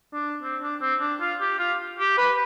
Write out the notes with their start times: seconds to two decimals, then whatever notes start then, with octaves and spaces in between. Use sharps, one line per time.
0.13 D4
0.43 C4
0.62 D4
0.81 C4
1.00 D4
1.20 F4
1.40 G4
1.59 F4
1.99 G4
2.18 B4